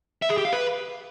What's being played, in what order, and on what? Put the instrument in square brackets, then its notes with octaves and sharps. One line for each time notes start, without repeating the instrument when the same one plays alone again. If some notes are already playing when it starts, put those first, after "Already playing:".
[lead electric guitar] E5
G#4
G4
F5
B4